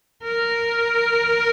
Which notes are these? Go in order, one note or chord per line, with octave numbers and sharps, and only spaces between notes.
A#4